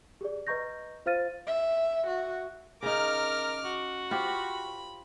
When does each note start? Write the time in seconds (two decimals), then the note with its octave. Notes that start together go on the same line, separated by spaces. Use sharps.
0.21 G4 G#4 D5
0.47 B4 D#5 A#5 C#6 G6 A#6
1.06 F4 C5 F5 F6 A6 D#7
1.46 E5
2.07 F#4
2.83 C#3 D#4 A#4 D6 F6
3.64 F#4
4.11 F4 G4 C5 B5